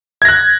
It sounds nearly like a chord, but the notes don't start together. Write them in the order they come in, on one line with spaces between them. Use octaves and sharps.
G#6 A#6 F#6